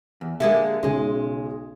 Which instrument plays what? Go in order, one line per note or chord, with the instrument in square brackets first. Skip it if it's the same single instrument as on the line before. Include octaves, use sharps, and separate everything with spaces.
[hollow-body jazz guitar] E2
[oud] D3 G#3 A#3 [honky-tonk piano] G4 [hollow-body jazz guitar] E5
[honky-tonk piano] B1 C#3 C6 [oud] G#3 G#4